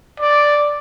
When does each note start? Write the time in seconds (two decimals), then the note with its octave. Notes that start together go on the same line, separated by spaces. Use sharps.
0.20 D5